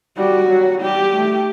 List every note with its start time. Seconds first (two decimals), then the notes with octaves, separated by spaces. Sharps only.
0.17 G3 F#4
0.49 F#3
0.81 G3 G4
1.13 A3